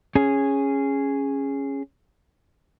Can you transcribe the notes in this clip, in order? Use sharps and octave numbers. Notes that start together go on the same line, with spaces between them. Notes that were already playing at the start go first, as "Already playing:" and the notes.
C#4 G#4